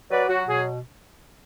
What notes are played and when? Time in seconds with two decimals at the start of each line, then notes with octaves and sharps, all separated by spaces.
0.11 F#3 B4 D5
0.29 F#3 F#4
0.48 B2 G#4